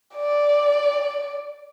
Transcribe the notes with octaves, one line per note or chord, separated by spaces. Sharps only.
D5